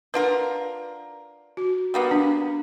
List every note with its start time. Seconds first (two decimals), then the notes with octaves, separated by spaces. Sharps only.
0.14 D4 F4 A#4 B4 F#5
1.57 F#4
1.94 G3 A#3 B3
2.11 D4